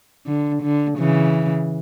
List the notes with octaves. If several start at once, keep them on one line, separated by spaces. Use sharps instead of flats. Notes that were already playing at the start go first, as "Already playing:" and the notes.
D3
D3
C#3 E3